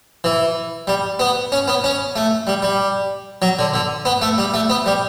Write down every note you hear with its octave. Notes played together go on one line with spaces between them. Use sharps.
E3
G3
B3
C#4
B3
C#4
A3
G3
G3
F#3
D3
D3
B3
A3
G3
A3
B3
G3